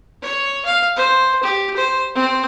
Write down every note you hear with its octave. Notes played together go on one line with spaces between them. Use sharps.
C#5
F5
C5
G4
C5
C4